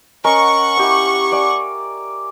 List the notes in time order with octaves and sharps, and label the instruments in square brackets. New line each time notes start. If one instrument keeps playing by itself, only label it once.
[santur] C#4 A#4 D#5 [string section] F#5 C#6
[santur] E4 G4 E6
D5 F5 G#5